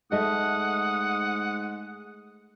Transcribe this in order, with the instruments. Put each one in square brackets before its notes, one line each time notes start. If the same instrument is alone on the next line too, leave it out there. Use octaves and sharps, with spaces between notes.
[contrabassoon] G#2 [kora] A3 D#5 [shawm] F#5 [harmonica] D#6